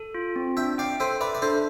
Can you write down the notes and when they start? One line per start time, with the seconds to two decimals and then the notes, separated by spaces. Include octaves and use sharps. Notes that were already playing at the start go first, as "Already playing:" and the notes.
Already playing: A4
0.14 F4
0.36 C4
0.57 D4 E5 G5
0.78 D5 F5 G5
1.00 A4 C5 E5
1.20 B4 D5 E5
1.35 D5
1.42 D4 A4 C5